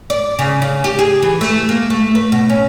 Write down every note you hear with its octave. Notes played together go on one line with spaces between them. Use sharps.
D5
C#3
C#3
G4
G#4
E3
A3
A#3
A3
B4
B2
C#4